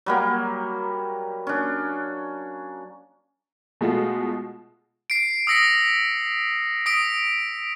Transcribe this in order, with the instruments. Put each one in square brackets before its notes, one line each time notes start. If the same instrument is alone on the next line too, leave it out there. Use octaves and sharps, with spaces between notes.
[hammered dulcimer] F#3 G3 A#3
C#4 D4
[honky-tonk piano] B2 G#3 A3 F4 F#4
[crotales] C7 D7
D#6 E6 A#6 B6 C#7
D#6 B6 D7